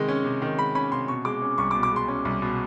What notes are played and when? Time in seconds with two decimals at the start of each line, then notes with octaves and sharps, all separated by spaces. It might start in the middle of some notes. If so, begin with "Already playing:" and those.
Already playing: C3 D#3 G#3
0.08 C#4
0.25 C3
0.42 D#3
0.58 G#3 B5
0.75 C#4 B5
0.92 C3 C6
1.08 B2 C#6
1.25 G#3 D6
1.42 C#4
1.58 C2 C#6
1.71 D6
1.75 B2
1.83 D6
1.92 G#3 C6
2.08 C#4
2.25 C2
2.42 B2